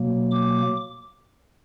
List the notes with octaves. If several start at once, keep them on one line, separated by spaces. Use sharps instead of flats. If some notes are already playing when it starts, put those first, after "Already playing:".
Already playing: B2 F#3 A#3
D6